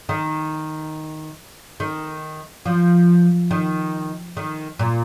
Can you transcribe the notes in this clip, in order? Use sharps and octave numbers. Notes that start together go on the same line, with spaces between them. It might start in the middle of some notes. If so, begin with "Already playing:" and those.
D#3
D#3
F3
D#3
D#3
A#2